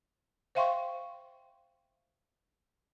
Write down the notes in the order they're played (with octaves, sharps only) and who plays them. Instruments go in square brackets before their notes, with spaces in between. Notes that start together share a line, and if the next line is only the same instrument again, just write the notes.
[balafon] C5 E5 F5 G5 C6 C#6